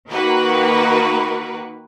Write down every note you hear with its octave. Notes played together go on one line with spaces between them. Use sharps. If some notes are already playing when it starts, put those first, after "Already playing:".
D#3 A#3 F#4 A#4 B4